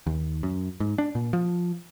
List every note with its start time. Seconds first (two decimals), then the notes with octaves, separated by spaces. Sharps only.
0.07 D#2
0.43 F#2
0.80 G#2
0.98 D4
1.15 A#2
1.33 F3